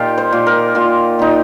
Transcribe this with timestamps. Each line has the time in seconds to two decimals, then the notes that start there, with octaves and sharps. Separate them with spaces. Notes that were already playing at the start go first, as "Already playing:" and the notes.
Already playing: A#2 D#4 F4 G4
0.18 C5
0.33 A#2
0.47 A#4
0.75 A#2 F4
1.19 A#2 D#4